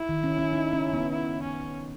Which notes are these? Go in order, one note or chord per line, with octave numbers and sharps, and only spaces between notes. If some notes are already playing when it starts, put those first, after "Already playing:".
Already playing: E4
D#3
C#4
C#4
D#4
C#4
B3
E4
C#4